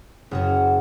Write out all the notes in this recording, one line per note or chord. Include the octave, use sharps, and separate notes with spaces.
F#1 F#4 F#5 G#5 F6